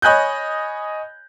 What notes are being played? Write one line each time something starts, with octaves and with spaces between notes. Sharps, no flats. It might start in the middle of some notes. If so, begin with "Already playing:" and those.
C#5 D#5 G#5 B5 F#6 G6